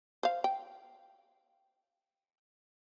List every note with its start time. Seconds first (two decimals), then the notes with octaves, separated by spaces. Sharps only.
0.23 C5 F5
0.44 G5